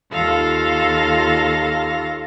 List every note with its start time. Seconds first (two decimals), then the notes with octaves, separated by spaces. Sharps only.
0.11 D#2 F4 A4 F5 A#6